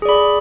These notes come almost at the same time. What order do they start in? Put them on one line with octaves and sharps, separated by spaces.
G#4 D5 B5